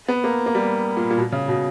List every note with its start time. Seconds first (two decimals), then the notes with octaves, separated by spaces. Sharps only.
0.08 B3
0.24 A#3
0.46 A#3
0.55 G3
0.97 A#2
1.10 A#2
1.18 B2
1.32 C#3
1.48 B2